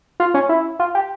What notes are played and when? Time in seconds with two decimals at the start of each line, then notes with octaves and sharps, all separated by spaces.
0.20 F4
0.34 C#4
0.49 E4
0.79 F4
0.95 G4